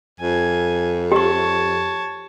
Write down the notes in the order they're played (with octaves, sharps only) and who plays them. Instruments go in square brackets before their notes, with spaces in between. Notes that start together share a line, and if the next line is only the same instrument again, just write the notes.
[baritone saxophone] F2 [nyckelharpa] G#5
[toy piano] G4 C#6 [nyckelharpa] C#5 A5